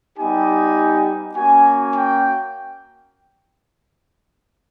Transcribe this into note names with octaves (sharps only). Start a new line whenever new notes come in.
G3 B3 D#4 G4 G#5
A#3 C#4 F#4 G#5
G5